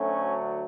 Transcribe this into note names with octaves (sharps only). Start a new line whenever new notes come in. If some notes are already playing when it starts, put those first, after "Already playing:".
Already playing: D2 D3 F#3 A3 C#4